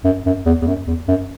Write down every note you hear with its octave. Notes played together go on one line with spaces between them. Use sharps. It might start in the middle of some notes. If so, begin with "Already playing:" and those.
F#2
F#2
E2
E2
F#2
E2
F#2